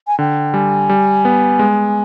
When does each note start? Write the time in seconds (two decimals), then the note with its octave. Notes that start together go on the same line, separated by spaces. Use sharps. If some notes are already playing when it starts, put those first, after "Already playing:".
0.07 G#5
0.19 D3 G5
0.54 G3 G#5
0.89 G3
1.25 B3
1.59 G#3